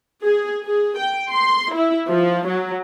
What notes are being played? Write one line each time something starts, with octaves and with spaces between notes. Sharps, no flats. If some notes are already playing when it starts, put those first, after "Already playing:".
G#4
G#4
G5
C6
E4
F3
F#3